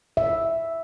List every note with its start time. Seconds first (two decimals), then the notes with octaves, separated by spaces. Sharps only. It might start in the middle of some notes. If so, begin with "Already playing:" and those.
0.17 E5